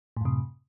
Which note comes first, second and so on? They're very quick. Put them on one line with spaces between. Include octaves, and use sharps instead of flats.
A2 F#2 C3